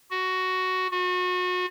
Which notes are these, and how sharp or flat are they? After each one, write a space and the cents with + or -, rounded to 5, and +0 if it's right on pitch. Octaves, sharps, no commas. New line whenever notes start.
F#4 +5
F#4 -35